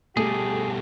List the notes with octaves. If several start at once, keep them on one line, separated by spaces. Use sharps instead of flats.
B2 G3 A3 G4 G#4